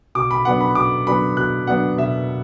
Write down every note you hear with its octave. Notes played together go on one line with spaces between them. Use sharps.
B2 D6
B5
F#3 B3 D4 F#5
B5
B2 D6
F#3 B3 D4 B5
B2 F#6
F#3 B3 D4 F#5
B2 E5